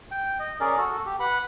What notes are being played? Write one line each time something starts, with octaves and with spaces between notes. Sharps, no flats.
G5
D#5
C#4 G#4 A#4 D5
F#4 A4
G4
B4 F#5 B5